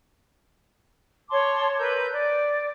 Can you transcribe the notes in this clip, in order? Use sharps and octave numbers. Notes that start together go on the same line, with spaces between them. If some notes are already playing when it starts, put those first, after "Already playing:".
C#5 A5 C6 D6
A#4 B4 E6 G6
D5